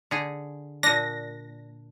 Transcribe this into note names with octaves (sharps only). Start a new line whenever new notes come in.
D3 G#4
A#2 D4 A#6